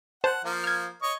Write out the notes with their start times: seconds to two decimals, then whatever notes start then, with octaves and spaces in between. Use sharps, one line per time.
0.24 C5 F#5 A5
0.44 F3 A#3
0.64 F6 G#6
1.02 C#5 D#5 C#6